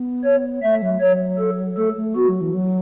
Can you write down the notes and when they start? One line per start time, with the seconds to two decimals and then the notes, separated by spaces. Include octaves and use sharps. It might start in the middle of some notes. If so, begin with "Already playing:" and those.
Already playing: B3
0.25 C#5
0.63 A3 E5
0.82 F#3
1.01 F#3 C#5
1.39 A4
1.77 A3 A4
1.96 A3
2.15 B3 F#4
2.28 F#3
2.41 E3
2.54 F#3